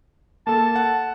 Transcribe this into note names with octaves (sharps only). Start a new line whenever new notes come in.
A#3 A4 A5
F#5